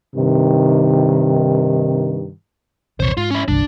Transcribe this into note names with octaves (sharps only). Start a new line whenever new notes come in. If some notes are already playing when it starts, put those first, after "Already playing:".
G2 C3 D#3
A#1 E2 C3 C5 C#5
G#2 F4
C#4 E4
G1 C2 G2 D4